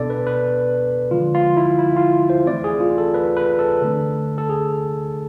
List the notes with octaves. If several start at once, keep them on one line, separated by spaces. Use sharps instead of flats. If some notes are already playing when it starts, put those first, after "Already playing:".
Already playing: B2 B3 D4 A4 D5
B4
B4
D3 F3 G#3 F4
F4
E4
E4
F4
C5
E3 A3 C4 D5
G#4
F4
A4
B4
B4
A4
D3 A3 D4
A4
G#4